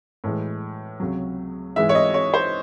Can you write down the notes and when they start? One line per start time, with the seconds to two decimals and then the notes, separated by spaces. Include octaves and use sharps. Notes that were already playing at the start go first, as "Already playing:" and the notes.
0.24 A2 E3 G#3
1.00 C#2 C3 F#3
1.76 G#2 E3 G#3 E5
1.89 C#5
1.95 D#5
2.14 C#5
2.34 C5